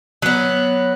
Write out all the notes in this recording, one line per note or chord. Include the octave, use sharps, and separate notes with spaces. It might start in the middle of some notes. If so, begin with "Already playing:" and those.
F#3 B3